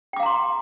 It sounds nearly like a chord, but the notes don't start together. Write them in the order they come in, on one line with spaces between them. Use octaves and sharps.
G5 D6 F5 A#5 C6